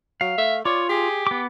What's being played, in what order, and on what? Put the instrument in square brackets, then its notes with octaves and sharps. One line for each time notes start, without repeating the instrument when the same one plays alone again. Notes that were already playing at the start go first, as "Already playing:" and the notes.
[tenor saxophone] F#3 [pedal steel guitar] F5
[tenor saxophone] A3 [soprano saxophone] E5
[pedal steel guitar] F4 [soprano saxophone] C#5 [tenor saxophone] D5
[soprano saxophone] G4 [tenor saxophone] G#4
[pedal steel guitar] B3 D6